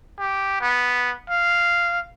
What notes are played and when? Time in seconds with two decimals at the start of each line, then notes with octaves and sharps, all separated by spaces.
0.19 G4
0.61 B3
1.30 F5